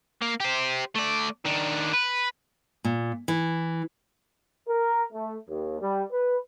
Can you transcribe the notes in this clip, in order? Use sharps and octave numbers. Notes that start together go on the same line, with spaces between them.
A#3
G4 C5
A3 D5
D#3 D4
B4
A#2
E3
A#4
A3
D#2
G3
B4